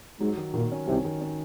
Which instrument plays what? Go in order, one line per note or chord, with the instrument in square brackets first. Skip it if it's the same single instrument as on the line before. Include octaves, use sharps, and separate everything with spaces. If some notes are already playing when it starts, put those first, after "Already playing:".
[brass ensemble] G#2 [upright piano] F#3
[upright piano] D#3
[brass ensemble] A#2 [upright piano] D#3
[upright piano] C#4
[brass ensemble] C2 C3 [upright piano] D#3
[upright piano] D#3
C#4